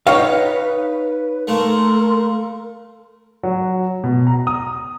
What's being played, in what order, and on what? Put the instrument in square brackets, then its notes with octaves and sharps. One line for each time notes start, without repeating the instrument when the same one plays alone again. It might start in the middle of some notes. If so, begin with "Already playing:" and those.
[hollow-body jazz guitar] D#4 C#5 F5 [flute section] B4
[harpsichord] A3 A#3 [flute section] A4 A#4 C6
[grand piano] F#3
B2
A#5
D#6